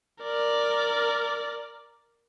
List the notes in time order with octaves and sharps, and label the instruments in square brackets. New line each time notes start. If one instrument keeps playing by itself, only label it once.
[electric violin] A#4 D5